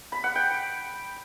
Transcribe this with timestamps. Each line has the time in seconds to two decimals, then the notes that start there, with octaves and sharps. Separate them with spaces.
0.12 B5
0.24 F#5
0.35 G5